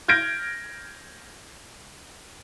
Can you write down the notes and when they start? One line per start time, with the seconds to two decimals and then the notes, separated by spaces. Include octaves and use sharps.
0.08 F6 G6 G#6 A#6 D7